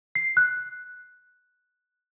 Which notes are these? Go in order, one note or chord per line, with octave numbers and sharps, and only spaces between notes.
C7
F#6